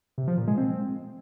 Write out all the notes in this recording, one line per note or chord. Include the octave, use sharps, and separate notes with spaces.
C3
F3
A#2
G#3
C4